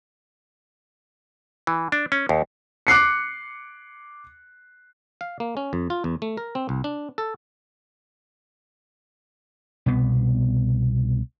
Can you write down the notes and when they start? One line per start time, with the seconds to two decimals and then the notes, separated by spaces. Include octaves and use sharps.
1.67 E3
1.92 D4
2.12 C#4
2.29 D#2
2.87 D6 F#6 C7 C#7
5.21 F5
5.40 A#3
5.57 C#4
5.73 F2
5.90 F4
6.04 E2
6.22 A3
6.37 A#4
6.55 C4
6.69 C2
6.84 D4
7.18 A4
9.86 C2 B2 B3